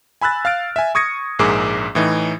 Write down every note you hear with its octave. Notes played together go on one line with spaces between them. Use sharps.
G#5 B5 E6 F#6 A6
F5 F6 A6 D7
E5 G#5
C#6 D#6 G#6 A#6 C#7
A#1 G#2 G#4 A#4 D6 E6
A2 E3 D#4